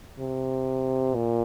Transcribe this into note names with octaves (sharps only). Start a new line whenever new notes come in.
C3
A#2